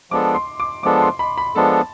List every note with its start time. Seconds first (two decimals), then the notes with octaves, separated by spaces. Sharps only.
0.11 F3 G#3 B3 D4 A4 D6
0.34 C6
0.60 D6
0.83 F3 G#3 B3 D4 A4 D6
1.02 C6
1.19 B5
1.38 B5
1.55 F3 G#3 B3 D4 A4 A5